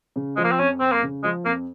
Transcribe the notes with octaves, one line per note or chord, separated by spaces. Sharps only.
C#3
F3 G#3
A#3
C4
F2 C#4
F2 C4
A#3
C#3
F3 G#3
F2 A#3